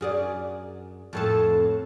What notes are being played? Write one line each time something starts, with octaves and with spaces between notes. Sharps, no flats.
F#2 G#4 D5
F2 A2 A4